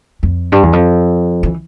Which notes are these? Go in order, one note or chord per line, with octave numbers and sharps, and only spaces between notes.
F2
G2
E2
F2
E3